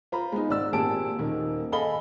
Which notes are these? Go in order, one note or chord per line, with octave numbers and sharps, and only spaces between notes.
F4 C5 A#5 B5
G#3 B3 D#4
G#1 D5 E6
G#1 A#2 G4 G#4 A5 D7
D#1 D#3 A#3
G#4 A4 D#5 F5 B5 G7